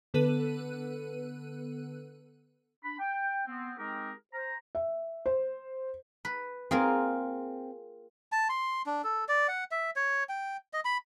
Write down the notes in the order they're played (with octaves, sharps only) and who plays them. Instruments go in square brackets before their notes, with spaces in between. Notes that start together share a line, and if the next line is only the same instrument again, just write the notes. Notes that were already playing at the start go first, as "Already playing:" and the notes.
[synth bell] D3 B3 A4 B4 F#6 D#7
[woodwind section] D4 B5
G5
B3 C4
G#3 C4 D#4 G4 G#4 A#4
C5 A#5
[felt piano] E5
C5
[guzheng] B4
[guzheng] A#3 F4 G#4 [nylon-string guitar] C4
[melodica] A5
C6
D4
A4
D5
F#5
E5
C#5
G5
D#5
B5